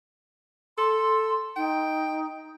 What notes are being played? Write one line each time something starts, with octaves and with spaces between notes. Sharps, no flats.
A4 C6
D#4 G5